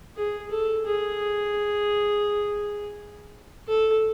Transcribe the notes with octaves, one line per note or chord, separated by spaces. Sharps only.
G#4
A4
G#4
A4